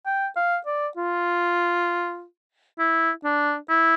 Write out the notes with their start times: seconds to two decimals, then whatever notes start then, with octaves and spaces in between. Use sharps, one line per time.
0.06 G5
0.36 F5
0.66 D5
0.97 F4
2.79 E4
3.24 D4
3.70 E4